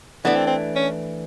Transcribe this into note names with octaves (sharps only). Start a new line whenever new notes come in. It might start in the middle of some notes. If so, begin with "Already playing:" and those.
E3 A3 B3 D4
C4
C4
C#4